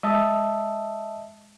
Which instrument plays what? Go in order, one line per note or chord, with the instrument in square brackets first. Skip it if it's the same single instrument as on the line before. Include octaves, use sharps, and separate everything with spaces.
[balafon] G#3 [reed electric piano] D#5 E5 A5